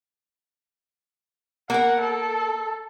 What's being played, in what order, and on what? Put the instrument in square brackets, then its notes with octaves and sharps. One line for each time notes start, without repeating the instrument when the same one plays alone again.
[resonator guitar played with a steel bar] A#3 A#4 [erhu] F#5
[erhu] A4